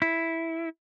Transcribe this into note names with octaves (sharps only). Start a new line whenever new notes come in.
E4